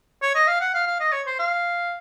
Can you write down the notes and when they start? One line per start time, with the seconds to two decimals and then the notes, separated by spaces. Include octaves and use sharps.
0.22 C#5
0.35 D#5
0.48 F5
0.61 F#5
0.75 F5
0.87 F5
1.00 D#5
1.13 C#5
1.26 C5
1.39 F5